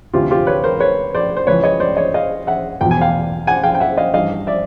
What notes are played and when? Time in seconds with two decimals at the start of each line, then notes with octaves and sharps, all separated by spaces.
0.14 D2 C3 E3 F4 G4
0.31 F4 G4
0.47 B4 C#5
0.64 A#4 C5
0.80 B4 C#5
1.15 C5 D5
1.37 C5
1.47 C#2 C#3 E3 B4 C#5
1.64 C#5 D#5
1.80 C5 D5
1.97 C#5 D#5
2.14 D#5 F5
2.47 E5 F#5
2.81 E2 B2 G5
2.91 G#5
3.01 F5 G5
3.47 F#5 G#5
3.63 F5 G5
3.75 G5
3.80 E5 F#5
3.97 D#5 F5
4.14 G2 E3 D#5 F5
4.47 D5 E5